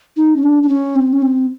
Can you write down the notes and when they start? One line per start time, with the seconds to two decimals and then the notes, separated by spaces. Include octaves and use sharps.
0.17 D#4
0.36 C#4
0.43 D4
0.63 D4
0.69 C#4
0.96 C4
1.13 C#4
1.22 C4